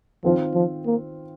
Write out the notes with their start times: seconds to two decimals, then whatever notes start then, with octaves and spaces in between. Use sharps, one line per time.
0.24 D#3 F3 C4 F4
0.54 F3
0.86 A#3